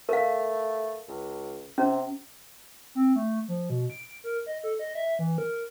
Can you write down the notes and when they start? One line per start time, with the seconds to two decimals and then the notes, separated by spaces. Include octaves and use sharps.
0.09 A3 A#4 F5
1.09 C#2
1.78 C3 C#4
2.95 C4
3.16 A3
3.48 F3
3.70 B2
3.90 D7
4.24 A#4
4.46 D#5
4.64 A4
4.79 D#5
4.95 E5
5.19 E3
5.38 A#4